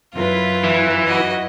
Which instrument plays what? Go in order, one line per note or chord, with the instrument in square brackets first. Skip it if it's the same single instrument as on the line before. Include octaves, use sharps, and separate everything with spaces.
[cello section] F#2 E4 B4 [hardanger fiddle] F4
[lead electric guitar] E3
[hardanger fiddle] F#4 D#5